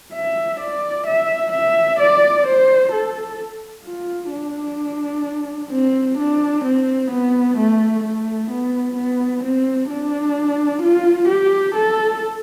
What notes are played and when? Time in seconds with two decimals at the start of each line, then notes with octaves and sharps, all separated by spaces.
0.13 E5
0.60 D5
1.07 E5
1.53 E5
1.99 D5
2.46 C5
2.92 A4
3.85 F4
4.31 D4
5.71 C4
6.18 D4
6.64 C4
7.11 B3
7.57 A3
8.04 A3
8.50 B3
8.96 B3
9.43 C4
9.89 D4
10.82 F4
11.29 G4
11.75 A4